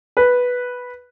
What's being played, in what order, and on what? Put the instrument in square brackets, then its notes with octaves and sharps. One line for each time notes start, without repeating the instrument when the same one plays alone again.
[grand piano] B4